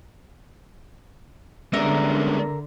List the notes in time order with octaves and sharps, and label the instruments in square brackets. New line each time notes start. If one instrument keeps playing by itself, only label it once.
[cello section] D3 [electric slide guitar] G3 G#3 B3 [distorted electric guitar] C#4 D4 [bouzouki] A#4 E5